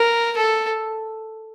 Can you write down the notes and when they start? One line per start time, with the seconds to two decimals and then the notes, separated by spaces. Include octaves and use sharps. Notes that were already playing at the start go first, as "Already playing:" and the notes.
Already playing: A#4
0.37 A4